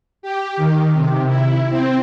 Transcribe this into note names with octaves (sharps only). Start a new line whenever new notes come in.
G4
D#3
C3
E4
C4